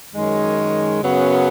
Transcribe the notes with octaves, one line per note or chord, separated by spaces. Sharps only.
F#2 D#3 G#3 C#4
F#2 C#3 F#3 B3